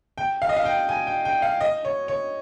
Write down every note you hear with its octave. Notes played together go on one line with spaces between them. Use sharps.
G5
F5
D#5
F5
G5
G#5
G5
G5
F5
D#5
C#5
C#5